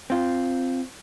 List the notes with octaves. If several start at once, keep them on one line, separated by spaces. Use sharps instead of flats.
C4 F4